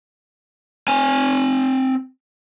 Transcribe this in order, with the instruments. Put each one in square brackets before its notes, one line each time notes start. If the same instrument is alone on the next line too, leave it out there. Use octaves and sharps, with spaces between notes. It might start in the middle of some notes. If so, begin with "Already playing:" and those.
[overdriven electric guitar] C4 G#5